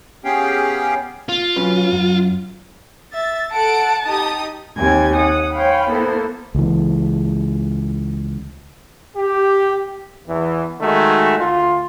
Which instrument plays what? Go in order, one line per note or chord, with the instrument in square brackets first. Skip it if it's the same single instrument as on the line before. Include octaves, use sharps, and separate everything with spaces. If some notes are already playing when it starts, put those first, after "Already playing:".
[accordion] B3 C#4 G4 G#4 F5 G5
[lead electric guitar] F4
[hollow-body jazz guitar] F#3 C#4 B4
F#2
[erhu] E5 [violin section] A6
[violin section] A4 F#5 D7 [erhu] A5
[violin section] D#4 G4 D#6
[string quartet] D#2 C4 G4 G5 G#5 G#6
F#5 D#6
C5 C#5 F5 G5 G#5 B5
A#3 B3 E4 A4 C5
[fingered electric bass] C#2 E3
[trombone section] G4
E2 E3
D#3 G#3 A3 F#4
D2 F4